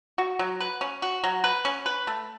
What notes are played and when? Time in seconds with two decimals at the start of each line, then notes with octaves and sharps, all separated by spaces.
0.18 F#4
0.39 F#3
0.60 B4
0.81 C#4
1.02 F#4
1.24 F#3
1.44 B4
1.65 C#4
1.86 B4
2.07 A3